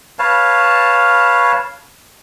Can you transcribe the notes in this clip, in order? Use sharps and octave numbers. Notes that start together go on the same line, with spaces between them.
B4 C#5 F5 A5